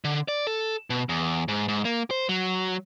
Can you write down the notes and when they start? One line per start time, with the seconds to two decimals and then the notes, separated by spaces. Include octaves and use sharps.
0.04 D3
0.28 D5
0.47 A4
0.90 B2
1.09 E2
1.48 G#2
1.68 G#2
1.85 A#3
2.11 C5
2.29 F#3